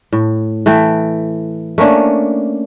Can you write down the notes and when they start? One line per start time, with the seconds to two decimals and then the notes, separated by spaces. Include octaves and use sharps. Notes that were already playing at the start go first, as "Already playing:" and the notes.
0.12 A2
0.66 E3 A3 A4 G5
1.78 A3 A#3 C#4 D4